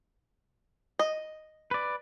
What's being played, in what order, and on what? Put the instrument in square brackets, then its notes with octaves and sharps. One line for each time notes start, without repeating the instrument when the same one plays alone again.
[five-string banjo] D#5
[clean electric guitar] B4 D5